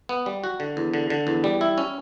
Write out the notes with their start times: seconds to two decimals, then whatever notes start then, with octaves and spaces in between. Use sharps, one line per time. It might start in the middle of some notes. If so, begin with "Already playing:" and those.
0.09 B3
0.26 G3
0.44 F#4
0.60 D3
0.77 E2
0.94 D3
1.10 D3
1.27 E2
1.44 G3
1.61 E4
1.78 C#4